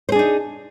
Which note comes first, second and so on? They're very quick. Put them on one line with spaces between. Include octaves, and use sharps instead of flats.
C5 G#4 D4 D#4